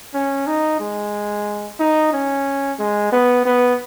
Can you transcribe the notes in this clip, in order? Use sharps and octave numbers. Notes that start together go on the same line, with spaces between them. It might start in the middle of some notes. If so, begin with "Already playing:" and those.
C#4
D#4
G#3
D#4
C#4
G#3
B3
B3